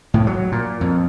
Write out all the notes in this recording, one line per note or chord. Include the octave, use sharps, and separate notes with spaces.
A2
F#3
A#2
F2